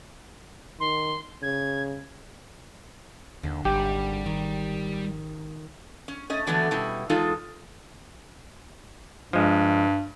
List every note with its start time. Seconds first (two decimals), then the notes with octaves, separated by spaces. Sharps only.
0.80 D#3 C6
1.43 C#3 G#6
3.43 D#2 D3
3.65 G#1 G3 G4
4.26 D#3
6.08 C#4
6.30 A3 C#4 D#5
6.47 D3 E3 F#3 A3 B3 D4
6.71 B2 G3 C#4 E4
7.10 E2 G#3 D#4 F4 A4
9.33 G2 F3 G#3